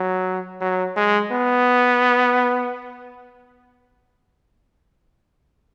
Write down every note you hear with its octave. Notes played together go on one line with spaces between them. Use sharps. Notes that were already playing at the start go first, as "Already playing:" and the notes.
Already playing: F#3
F#3
G#3
B3